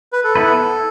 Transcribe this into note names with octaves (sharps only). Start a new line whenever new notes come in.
B4
A4
B3 E4 B4